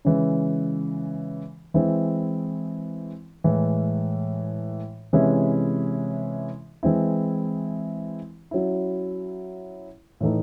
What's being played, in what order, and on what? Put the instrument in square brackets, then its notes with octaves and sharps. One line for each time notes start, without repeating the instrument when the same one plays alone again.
[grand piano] C#3 E3 G#3
E3 G#3 C4 E4
A2 E3 G#3
C3 E3 G#3 C#4 E4
E3 G#3 C4 E4
F#3 C#4 E4
A2 E3 A3 D#4